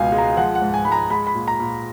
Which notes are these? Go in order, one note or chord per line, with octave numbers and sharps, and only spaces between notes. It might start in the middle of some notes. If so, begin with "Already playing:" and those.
Already playing: C#2 B2 F5 G#5
G#3
A#5
F3 F#5
F#5
G#2
G#5
G#3 B5
A#5
G#3 B5
B5
A#2
A#5
A#2